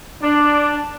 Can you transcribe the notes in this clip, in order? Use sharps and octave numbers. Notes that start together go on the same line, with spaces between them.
D4